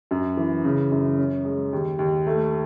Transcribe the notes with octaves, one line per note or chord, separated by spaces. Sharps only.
F#2
E3
C#3
F#2
C#4
G#3
D#2
D#2
A3